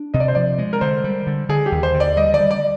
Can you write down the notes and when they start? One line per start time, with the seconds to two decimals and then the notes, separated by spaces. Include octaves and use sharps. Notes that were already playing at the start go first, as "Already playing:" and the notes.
Already playing: D4
0.14 C3 D#5
0.20 D5
0.28 C5
0.35 F3 D5
0.58 G#3
0.73 A#4
0.81 D3 C5
1.04 G3
1.27 D3
1.49 D3 G#4
1.66 G4
1.72 D#2
1.83 C5
1.94 D3
2.00 D5
2.17 G3 D#5
2.34 D5
2.40 G3
2.51 D5